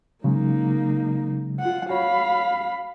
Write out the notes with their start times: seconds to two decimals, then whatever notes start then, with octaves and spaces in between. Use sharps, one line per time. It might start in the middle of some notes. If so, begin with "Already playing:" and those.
0.24 C#3 F#3 G#3 A#3 D#4
1.60 F4 F#5
1.90 F#4 C#5 F5 B5